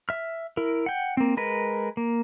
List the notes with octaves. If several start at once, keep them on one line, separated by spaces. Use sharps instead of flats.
E5 F6
E4 A#4
F#5 G5
A#3 C4
G#3 A#4 B4
A#3